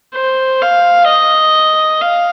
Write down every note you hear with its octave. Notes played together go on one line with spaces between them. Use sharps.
C5
F5
D#5
F5